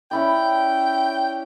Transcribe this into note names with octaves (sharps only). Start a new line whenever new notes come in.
C#4 E4 D5 G5